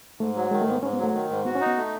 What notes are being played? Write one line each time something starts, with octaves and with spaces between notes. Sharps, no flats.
G#2 A3
F#3
D#3 G#3
A3
G#2
B3
G#2 C#4
B3
F#3
A3
D#3
G#2
B3 F#4
C#4
D#4
B3
A3